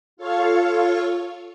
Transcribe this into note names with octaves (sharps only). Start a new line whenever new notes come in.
F4 A4 C#5 F5 C#6